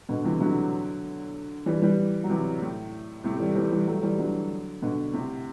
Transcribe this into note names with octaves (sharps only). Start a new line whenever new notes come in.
B2 D3
C3 E3
D3 F#3
E3 G3
E3 G3
F#3
C3 E3
A2
A2 C3
A3
E3 G3
E3 G3
E3 G3
F#3 A3
E3 G3
D3 F#3
B2 D3
A2 C3